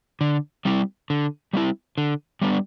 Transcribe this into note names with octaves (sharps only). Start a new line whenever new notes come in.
D3
G3 C4 E4
D3
G3 C4 E4
D3
G3 B3 D4